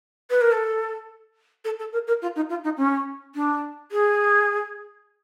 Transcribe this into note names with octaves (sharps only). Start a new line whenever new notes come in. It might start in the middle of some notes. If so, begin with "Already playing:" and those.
B4
A#4
A4
A4
A4
A#4
A#4
F4
D#4
F4
D#4
C#4
D4
G#4